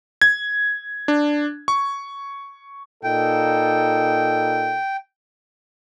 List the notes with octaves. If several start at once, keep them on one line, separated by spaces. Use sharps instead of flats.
G#6
D4
C#6
A#2 D#4 A4 G5